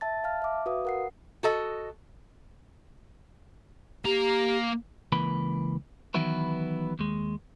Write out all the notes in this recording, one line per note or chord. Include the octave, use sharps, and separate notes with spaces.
E5 A5 A6
F5 A5 F6
E5 D6
F#4 B4 F5 D#6
A#4 F#5 C7
F#4 A4 D#5
A#3 G4 A#5
C#2 E3 A#3 B4 B5
D#3 E3 F#3 B3 E4 B4
D#2 G#3